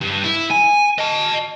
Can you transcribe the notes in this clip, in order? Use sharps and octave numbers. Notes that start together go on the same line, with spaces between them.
G2
E4
G#5
D#5 A5